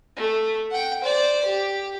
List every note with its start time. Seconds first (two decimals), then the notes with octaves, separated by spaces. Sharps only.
0.17 A3
0.71 F#5 G5
1.01 C5 D5
1.45 G4